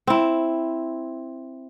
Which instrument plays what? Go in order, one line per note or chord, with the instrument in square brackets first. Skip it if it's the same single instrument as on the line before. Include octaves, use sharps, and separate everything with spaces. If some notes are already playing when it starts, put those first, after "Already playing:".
[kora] C4 E4